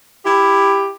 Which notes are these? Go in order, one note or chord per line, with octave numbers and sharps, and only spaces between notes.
E4 G4